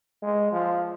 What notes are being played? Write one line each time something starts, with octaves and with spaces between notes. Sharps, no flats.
G#3
F3